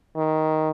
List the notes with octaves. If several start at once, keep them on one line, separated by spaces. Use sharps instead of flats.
D#3